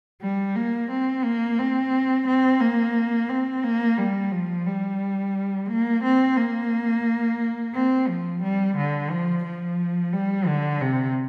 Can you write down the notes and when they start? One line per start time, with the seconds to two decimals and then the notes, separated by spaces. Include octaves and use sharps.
0.21 G3
0.56 A#3
0.90 C4
1.24 A#3
1.58 C4
2.27 C4
2.61 A#3
3.29 C4
3.63 A#3
3.98 G3
4.31 F3
4.66 G3
5.69 A#3
6.02 C4
6.36 A#3
7.74 C4
8.08 F3
8.42 G3
8.77 D3
9.11 F3
9.44 F3
10.13 G3
10.47 D3
10.81 C3